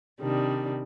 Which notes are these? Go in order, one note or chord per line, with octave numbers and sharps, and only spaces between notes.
C3 D#3 G3 D4